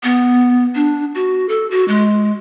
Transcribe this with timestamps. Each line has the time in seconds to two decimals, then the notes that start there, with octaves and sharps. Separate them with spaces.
0.03 B3
0.75 D4
1.15 F#4
1.49 A4
1.71 F#4
1.88 G#3